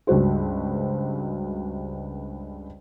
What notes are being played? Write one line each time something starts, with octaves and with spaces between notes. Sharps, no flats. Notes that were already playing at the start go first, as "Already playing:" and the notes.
C#2 G2 F#4 C5